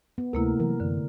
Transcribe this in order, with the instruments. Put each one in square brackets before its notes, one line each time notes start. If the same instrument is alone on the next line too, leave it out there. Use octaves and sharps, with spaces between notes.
[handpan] B3
[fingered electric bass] D2 [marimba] C3 A#3 E4 [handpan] A3 A#4
[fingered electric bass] E3 F#3 [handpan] A#4
[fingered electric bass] F#2 E3 [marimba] D3